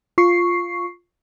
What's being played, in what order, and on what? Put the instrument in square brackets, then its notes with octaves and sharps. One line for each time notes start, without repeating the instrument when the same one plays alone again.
[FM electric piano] F4 C#6 C7